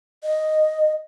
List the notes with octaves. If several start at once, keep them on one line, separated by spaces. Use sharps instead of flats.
D#5